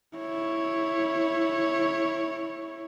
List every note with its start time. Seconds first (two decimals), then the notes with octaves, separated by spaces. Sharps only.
0.17 E4 C#5